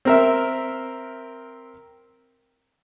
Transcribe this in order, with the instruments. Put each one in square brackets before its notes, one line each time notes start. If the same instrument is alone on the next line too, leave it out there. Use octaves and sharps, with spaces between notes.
[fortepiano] C4 A#4 E5